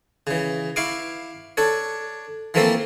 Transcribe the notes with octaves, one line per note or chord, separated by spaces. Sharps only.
C#3 E3
E4 F5 C#6 D6
D4 A4 C#5
E3 F3 A3 A#3 C4 A4